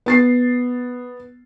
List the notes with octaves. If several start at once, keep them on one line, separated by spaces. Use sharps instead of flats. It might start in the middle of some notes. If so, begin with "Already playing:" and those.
B3 A6 C7